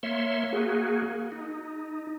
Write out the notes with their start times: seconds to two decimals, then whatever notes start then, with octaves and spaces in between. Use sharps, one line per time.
0.03 A#3 C#5 E5 C6
0.53 A#3 F#4 G#4
1.32 D#4